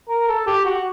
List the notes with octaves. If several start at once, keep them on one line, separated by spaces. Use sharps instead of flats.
A#4
A4
G4
F#4